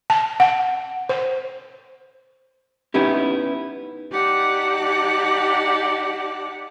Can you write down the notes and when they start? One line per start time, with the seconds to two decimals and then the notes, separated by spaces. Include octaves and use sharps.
0.10 A5
0.40 F#5
1.09 C5
2.94 B3 C#4 D#4 E4 G4
4.12 D#4 G4 D5 F#5 A5